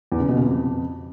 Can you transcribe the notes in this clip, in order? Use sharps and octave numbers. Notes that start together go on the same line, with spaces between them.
E2
C#3
B2
C#3
F2